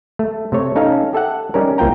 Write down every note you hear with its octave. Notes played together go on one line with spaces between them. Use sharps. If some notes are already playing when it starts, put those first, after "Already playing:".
A3
C3 A3 C#5
C#4 D#4 A4 F5
G4 A4 E5 F#5
G3 C#4 D#4 A#4
C2 A#3 F4 G5 A#5